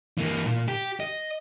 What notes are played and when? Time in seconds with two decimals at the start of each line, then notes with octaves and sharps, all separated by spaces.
0.18 E3 A#3
0.46 A#2
0.68 G4
1.00 D#5